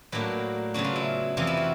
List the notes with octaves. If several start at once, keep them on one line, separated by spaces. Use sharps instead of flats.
A2 F#3 A#3 D4 B4
C#3 F#3 B3 D4 F#4
F4
E4
F2 C3 E3 F4
E4
F#4